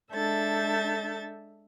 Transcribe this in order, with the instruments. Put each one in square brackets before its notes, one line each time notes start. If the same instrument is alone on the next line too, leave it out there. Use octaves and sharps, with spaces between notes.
[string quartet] G#3 D4 A4 E5 G6 A6